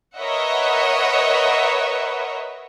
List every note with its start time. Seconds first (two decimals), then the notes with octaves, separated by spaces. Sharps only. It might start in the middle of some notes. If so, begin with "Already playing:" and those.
0.19 A#4 B4 C#5 D#5 E5 F#5